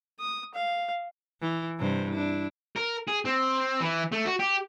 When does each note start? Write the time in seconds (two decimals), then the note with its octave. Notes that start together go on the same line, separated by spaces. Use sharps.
0.20 D#6
0.54 F5
1.41 E3
1.79 G2 C3 C5
2.11 D4 E4
2.76 A#4
3.08 G#4
3.25 C4
3.81 E3
4.12 A3
4.25 F#4
4.39 G4